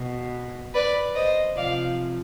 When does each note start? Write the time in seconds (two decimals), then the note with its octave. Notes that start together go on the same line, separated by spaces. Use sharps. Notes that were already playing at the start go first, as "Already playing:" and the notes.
Already playing: B2
0.74 B4 D5
1.15 C5 D#5
1.56 C3 F3 D5 F5